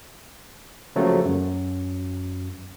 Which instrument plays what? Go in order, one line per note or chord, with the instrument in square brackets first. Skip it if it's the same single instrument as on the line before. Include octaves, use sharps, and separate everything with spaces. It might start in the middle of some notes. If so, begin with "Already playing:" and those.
[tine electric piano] C#3 F3 F#3 A3 A#3
F#2